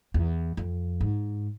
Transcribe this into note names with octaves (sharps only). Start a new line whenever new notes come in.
E2
F2
G#2